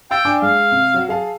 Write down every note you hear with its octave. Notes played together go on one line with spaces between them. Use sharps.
F5 G5 E6 A6
D4 G#5 D6
G#3 F5
C3
F#3 F#4
G#4 F5 A5